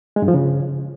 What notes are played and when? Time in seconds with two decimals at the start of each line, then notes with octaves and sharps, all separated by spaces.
0.16 G#3
0.22 G2
0.28 F3
0.34 C#3